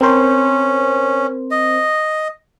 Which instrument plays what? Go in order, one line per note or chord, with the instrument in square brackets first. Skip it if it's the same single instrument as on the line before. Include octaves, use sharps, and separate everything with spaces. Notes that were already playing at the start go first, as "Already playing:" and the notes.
[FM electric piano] C4 A#4 C5 [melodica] C#4
[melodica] D#5